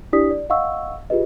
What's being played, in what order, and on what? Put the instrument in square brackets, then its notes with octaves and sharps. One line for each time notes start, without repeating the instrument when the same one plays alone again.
[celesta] D4 E4 G4 D5 D#6 B6
D5
D#5 F5 F#5 C#6 E6
F4 G4 G#4 B4 D#5